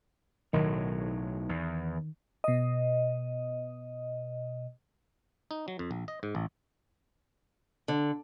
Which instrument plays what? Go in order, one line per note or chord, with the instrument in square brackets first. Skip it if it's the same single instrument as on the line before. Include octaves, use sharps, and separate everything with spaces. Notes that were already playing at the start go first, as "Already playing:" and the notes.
[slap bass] B1 A2 F#3 [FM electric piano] D#3
[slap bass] E2
[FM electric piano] B2 D#5
[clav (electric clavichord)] D#4
F#3
F2
A#1
D#5
G#2
A1
[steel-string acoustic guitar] D3